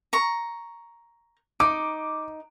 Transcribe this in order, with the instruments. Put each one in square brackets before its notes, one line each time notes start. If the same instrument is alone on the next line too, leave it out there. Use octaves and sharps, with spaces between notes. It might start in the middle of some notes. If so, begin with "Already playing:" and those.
[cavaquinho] A#5 C#6
[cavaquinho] D#4 [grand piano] D6